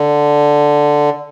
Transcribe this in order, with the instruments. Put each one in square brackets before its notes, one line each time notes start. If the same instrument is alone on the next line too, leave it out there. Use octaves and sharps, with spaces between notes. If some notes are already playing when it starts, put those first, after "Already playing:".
Already playing: [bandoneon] D3